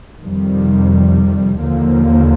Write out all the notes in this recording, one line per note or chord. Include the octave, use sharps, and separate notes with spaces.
F2 C3 D#3 G3
D#2 D3 F3 A#3